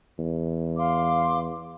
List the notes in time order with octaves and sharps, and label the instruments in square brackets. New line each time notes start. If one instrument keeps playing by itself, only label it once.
[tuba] E2
[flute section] F5 C6 D6